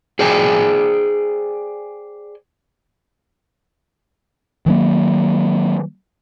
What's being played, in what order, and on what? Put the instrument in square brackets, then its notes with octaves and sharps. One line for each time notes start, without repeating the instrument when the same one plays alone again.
[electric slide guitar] G#4 C5 D5 G5 G#5
[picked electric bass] D#3 F#3 A#3